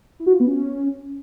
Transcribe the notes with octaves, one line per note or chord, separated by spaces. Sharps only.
E4
F#4
F4
B3
C#4